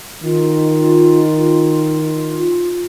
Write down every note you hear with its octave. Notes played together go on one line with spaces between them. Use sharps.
D#3 F4